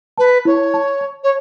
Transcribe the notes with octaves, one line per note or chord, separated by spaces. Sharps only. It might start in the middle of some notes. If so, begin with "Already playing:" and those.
B4 A5
E4 C#5
A5
A5
C#5